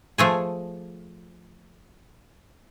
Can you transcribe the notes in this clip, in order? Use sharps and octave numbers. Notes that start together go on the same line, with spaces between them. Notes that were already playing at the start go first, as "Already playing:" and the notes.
F3 A3 G#4